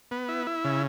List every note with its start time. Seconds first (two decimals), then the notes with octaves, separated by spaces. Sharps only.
0.11 B3
0.28 E4
0.47 E4
0.65 C#3